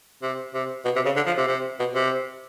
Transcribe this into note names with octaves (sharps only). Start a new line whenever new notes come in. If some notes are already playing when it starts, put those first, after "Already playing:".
C3
C3
B2
C3
C#3
D3
F3
C3
C3
B2
C3